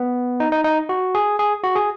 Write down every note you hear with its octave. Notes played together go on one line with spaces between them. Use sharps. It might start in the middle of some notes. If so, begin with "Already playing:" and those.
Already playing: B3
D#4
D#4
D#4
F#4
G#4
G#4
F#4
G#4